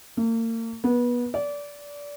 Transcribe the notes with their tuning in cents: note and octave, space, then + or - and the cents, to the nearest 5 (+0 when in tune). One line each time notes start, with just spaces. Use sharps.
A#3 -40
B3 -25
D5 -25